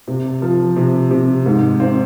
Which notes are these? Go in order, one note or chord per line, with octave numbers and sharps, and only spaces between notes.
C3
F3
C3
C3
G#2
C4